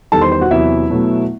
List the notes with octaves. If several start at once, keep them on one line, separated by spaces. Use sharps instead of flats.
E2 D#3 G3 A4 A5
C5 C6
C5 C6
F#4 F#5
E2 C3 F#3 E4 E5
B2 F#3 A3